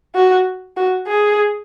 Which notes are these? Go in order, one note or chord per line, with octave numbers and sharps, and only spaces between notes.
F#4
F#4
G#4